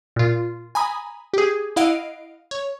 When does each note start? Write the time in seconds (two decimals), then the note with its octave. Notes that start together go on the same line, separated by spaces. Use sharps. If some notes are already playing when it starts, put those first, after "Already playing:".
0.16 A#2 F4
0.75 G#5 A#5 B5 D#6
1.34 G4 G#4
1.76 E4 D#5 F5 F#5 D7
2.51 C#5